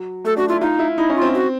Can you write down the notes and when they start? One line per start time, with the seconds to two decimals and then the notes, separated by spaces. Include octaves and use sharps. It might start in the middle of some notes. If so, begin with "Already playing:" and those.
Already playing: F#3
0.24 A3 A4
0.37 D4 F#4
0.49 E4 F4
0.61 D#4 F4
0.79 E4
0.98 D#4 E4
1.10 C#4
1.15 F4
1.22 C4
1.34 F#4